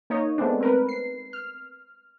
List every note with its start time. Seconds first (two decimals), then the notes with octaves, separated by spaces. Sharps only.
0.10 A#3 D#4 C#5 D#5
0.38 G#3 A3 B3 C4 D4
0.61 C4 A#4 B4
0.89 C7
1.33 F6